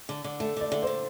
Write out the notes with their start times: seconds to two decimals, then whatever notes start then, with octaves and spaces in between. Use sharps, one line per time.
0.09 D3
0.24 D3
0.40 A3 A4
0.56 D3 D5
0.71 D3 A4
0.83 C5
0.87 D3